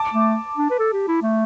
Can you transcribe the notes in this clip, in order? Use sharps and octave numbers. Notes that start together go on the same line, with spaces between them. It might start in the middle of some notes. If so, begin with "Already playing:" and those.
Already playing: A5 D6
A3
D4
B4
A4
G4
E4
A3